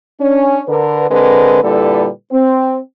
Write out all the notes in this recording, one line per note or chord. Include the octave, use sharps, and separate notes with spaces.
C#4 D4
D3 A#4 B4
D3 G#3 C4 A#4 B4
A#2 D3 G3 E4 A4 B4
C4